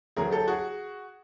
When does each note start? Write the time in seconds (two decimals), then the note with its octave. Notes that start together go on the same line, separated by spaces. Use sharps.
0.16 D2 D3 F#3 G#4 A#4
0.31 G4 A4
0.48 F#4 G#4